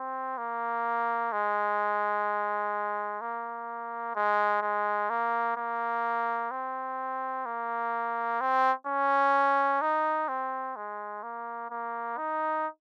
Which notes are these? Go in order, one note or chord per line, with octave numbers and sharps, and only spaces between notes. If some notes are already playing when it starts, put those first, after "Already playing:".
Already playing: C4
A#3
G#3
A#3
G#3
G#3
A#3
A#3
C4
A#3
C4
C#4
D#4
C4
G#3
A#3
A#3
D#4